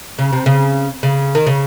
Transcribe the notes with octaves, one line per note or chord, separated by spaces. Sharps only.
C#3
C3
C#3
C#3
D#3
C#3